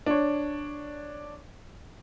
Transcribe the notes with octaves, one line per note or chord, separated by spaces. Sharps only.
D4 C#5